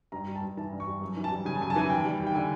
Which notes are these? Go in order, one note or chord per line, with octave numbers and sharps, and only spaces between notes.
G2 A#5
G3
A5
G2
E3 A5
G2
C#6
G3
F#2
E3
A5
G3
C#3 G#5
A5
F#2 G#5
A5
E3 G#5
D#2 G5
G3
D#2
G5
D3 G#5